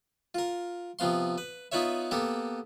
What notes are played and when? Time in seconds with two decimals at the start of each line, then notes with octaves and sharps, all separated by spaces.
0.35 F4 A#4
0.99 C3 F3 B3 F5 C6
1.38 B4
1.72 B3 D#4 F4 B4 C#5 E5
2.11 A#3 B3 G4 A4